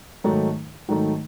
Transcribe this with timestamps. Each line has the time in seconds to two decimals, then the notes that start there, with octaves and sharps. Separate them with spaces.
0.24 G#2 D#3 F#3 A3 D#4
0.88 G#2 D#3 F#3 A3 D#4